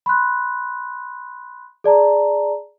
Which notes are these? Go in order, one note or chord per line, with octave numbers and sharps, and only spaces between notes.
B5 C6 F#6
G#4 D5 A5 A#5